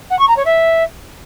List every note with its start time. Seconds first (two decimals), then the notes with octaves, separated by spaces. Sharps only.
0.10 F#5
0.19 C#6
0.28 A#5
0.37 C#5
0.45 E5